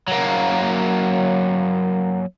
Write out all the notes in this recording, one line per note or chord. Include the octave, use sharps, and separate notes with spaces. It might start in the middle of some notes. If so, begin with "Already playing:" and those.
F#3 A#3